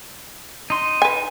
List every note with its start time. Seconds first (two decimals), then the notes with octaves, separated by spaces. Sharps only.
0.70 D#4 C6
1.02 B4 G#5